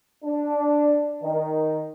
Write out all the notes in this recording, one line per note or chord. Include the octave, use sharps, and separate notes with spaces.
D4
D#3